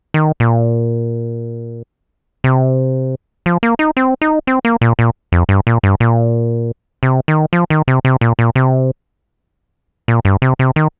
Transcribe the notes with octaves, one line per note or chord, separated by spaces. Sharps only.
D#3
A#2
C3
F3
A#3
D#4
C4
D#4
C4
A#3
A#2
A#2
F2
G2
A#2
G2
A#2
C3
D#3
F3
D#3
C3
C3
A#2
A#2
C3
A#2
G2
C3
C3
D#3